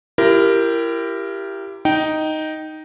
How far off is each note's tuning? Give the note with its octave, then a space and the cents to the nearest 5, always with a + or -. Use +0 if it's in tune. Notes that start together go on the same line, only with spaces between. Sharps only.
E4 +35 G4 +0 A#4 +0
D#4 +0 G5 -15